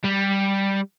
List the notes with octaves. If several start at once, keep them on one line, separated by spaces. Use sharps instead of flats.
G3